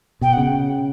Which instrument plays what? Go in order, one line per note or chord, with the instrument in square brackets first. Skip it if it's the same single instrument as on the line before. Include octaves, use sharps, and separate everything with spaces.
[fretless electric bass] B2 [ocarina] G5
[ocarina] F#5
[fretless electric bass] C#3